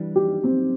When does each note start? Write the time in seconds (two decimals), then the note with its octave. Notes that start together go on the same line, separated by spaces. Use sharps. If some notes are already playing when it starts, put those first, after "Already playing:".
Already playing: E3 G3 D4
0.15 G4
0.44 C4